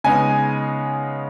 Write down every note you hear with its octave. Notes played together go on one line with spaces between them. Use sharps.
C#3 G#3 B3 D#4 G#5